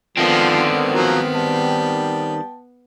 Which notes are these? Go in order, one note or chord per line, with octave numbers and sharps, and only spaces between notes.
D3 D#3 F3 B3 C4 F4
F3 F#3 A#3
G3 G5 A5